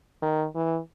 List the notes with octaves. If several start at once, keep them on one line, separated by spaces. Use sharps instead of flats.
D#3
E3